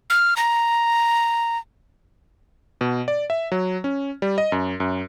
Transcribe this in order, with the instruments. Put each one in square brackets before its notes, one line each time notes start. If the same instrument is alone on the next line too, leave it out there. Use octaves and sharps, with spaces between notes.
[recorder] F6
A#5
[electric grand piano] B2
D5
E5
F#3
C#4
G3
D#5
F#2
F#2